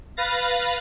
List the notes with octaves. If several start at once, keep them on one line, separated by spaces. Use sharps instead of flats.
B4 F5 A6 A#6